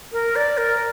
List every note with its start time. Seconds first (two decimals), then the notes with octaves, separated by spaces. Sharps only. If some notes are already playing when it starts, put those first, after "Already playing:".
0.13 A#4
0.36 D5
0.58 A#4